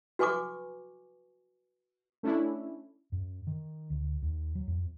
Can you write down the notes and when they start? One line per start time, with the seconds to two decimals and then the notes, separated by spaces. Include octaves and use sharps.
0.19 F#4 B4 G#5 C#6 D6
2.23 A3 C#4 D4 E4
3.12 F#2
3.47 D#3
3.90 D2
4.22 D#2
4.55 F#3
4.67 F2